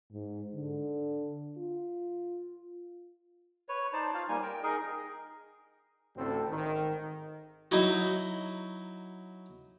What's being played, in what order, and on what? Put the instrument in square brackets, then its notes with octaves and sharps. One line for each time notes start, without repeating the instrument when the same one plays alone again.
[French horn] G#2
D3
F4
[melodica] B4 C#5
D#4 C5 D5 A5
F4 F5
G3 A#3 D#4 G#5
A#4 G5
D#4 G#4 A#4 D#5
[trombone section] A1 D2 A2 C4 A4
G#1 D#3
[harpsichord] F#3 D#4 E4 F#4